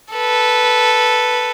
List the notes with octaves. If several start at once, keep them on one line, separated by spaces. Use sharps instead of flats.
A4 B4